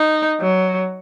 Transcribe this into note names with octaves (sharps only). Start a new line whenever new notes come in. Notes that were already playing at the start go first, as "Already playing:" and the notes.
Already playing: D#4
F#3